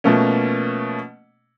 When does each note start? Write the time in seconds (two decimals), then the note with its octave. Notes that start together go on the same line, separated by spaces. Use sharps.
0.04 B2 F3 A3 A#3 C#4